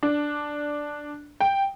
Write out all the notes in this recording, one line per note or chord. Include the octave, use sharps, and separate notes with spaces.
D4
G5